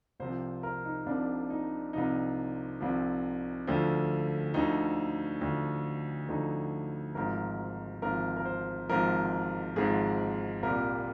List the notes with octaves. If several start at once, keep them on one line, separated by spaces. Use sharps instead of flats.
C2 C3 F3 C5
A#4
D#4
C2 C3 F3 D4
D#4
C2 C3 F3 D#4
C2 C3 F3
D2 D3 F3
D2 D3 F3 D#4
D2 D3 F3
D2 D3 F3 D#4
G#1 G#2 F3 A#4
G#1 G#2 F3 A#4
A#4
C5
G#1 G#2 F3 A#4
G#1 G#2 F3 G#4
C2 A#2 G3 A#4